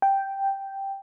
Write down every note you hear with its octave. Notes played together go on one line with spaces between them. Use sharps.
G5